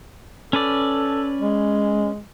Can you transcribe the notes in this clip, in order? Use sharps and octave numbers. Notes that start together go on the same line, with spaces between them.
C#4 A4 B4 D5
G#3